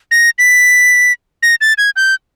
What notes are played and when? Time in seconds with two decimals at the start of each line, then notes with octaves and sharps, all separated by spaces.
0.11 A#6
0.39 B6
1.43 A#6
1.61 A6
1.78 G#6
1.96 G6